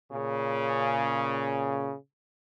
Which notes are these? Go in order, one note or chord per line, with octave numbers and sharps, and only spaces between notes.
A#2 C#3